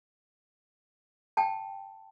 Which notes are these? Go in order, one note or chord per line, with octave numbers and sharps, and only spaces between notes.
G5 A5